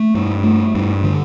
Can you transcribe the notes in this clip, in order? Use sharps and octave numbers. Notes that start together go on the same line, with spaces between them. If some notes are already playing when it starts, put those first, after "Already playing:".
Already playing: A3
G2
A3
G2
D3